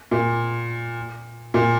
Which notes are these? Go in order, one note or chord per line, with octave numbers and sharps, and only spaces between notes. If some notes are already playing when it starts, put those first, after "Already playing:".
A#2
A#2